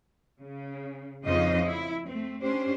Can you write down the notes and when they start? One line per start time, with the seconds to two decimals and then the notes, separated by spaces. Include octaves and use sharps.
0.40 C#3
1.24 F2 C#3 D#4 F4 C5 D#5
1.65 E4
2.07 A3 C4
2.41 C#4 D4 G4 C5